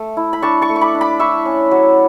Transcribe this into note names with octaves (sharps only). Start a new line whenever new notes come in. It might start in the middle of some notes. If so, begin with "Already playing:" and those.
Already playing: A3
E4
B5
D4 A5 C#6
A5 C#6
A3
C#6
B5 D6
D4
B5 D6
E4 C#6 E6
C#4
F#3